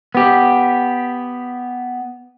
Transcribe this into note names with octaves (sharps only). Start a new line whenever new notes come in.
B3 G4